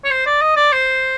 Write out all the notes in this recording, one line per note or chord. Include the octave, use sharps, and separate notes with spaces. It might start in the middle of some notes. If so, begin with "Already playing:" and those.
C#5
C5
D5
D#5
D5
C5